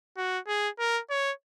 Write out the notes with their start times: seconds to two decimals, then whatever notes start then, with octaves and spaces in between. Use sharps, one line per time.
0.17 F#4
0.48 G#4
0.79 A#4
1.10 C#5